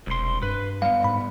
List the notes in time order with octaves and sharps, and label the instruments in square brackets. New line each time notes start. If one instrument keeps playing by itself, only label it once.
[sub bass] E1 [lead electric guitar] C2 C6
[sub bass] G2 [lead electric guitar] B4
[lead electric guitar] G3 B3 [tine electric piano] F5
[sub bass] G#2 [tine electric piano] B5